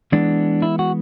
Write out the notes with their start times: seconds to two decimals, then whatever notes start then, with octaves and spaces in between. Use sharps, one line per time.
0.12 E3 G#3 B3 D4
0.62 E4
0.79 F#4